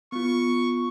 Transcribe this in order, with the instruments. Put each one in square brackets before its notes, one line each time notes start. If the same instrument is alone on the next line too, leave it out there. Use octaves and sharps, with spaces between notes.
[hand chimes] B3 F4 [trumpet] C#6